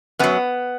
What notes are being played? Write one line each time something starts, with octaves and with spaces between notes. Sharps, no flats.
F#2 F#3 B3